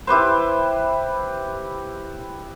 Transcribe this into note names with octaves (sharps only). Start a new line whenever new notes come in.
E4 G4 B4 C5